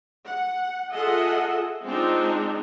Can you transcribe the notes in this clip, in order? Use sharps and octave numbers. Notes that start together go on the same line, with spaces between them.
F#5
F4 G#4 A4 D#5 E5 F#5
G#3 C4 D4 D#4 F4